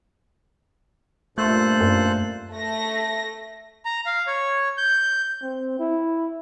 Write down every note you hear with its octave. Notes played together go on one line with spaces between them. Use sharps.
G2 A#2 A3 F4 A4 C5 F#6
F#2
A3 A#6
A#5
F5
C#5
G6
C4
E4